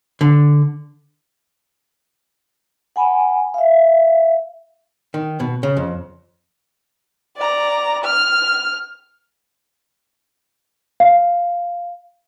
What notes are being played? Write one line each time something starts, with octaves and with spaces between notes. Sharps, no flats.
D3
F#5 G#5 B5
E5 F5
D#3
B2
C#3
F2
D5 A#5
F6
F5